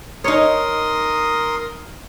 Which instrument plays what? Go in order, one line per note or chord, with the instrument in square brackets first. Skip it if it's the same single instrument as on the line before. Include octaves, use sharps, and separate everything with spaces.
[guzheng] D#4 C#5 [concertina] A#4 C6 D#6